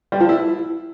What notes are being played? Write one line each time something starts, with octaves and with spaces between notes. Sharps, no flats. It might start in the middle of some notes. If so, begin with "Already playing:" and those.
G3
F3
E4